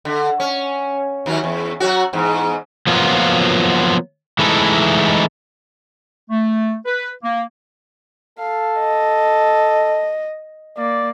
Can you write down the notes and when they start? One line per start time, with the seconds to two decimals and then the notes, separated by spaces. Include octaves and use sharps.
0.05 D3
0.40 C#4
1.26 D#2 F#3 C#4
1.44 E2
1.80 F#3 C#4 F#4
2.13 E2 G#2
2.87 F3 F#3 A#3 B3 F4
4.39 E3 G#3 A3 D#4 E4
6.30 A3
6.86 B4
7.23 A#3
8.39 A4 F5
8.80 D#5
10.78 A#3 D5